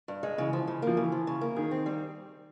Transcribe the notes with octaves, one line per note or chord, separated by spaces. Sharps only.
G2
G#3
C#3 E3
F3
C#3
F3 A#3
C#3 E3
F3
C#3
A#3
D#3 G#4
C4
G3